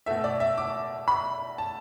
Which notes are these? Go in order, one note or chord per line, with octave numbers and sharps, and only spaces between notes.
B2 A3 E5
D5
E5
D6
B5
A5